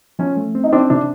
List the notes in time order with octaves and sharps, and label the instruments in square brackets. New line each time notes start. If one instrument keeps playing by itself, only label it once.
[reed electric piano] F3 [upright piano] C#4
[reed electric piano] A3
C4
[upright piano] D#4
[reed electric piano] C4 [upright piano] D4
[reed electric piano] C3 [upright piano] D4